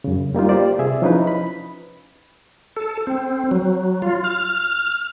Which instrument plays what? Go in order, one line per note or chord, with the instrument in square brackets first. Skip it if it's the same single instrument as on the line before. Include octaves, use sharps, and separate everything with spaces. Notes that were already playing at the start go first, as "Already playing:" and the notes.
[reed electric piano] F#2 C#3
G3 A#3 D#4 F4
A#3 F4 G4 C5 D5
C3 G#4 E5
F3 C#4 D#4 E4 B4
B5
[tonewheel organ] A4
C4
F#3
F4
F6